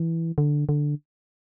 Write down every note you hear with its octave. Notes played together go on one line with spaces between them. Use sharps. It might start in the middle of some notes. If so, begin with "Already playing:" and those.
Already playing: E3
D3
D3